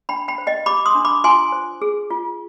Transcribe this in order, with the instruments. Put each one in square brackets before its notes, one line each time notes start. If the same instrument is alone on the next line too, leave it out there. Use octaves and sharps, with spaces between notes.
[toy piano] D4 G5 B5
G5 B5
C5
D#5 G5
G4 B5 D6
C6 D#6
D4
B5 D6
F4 G#5 C6
C5
G#4
F4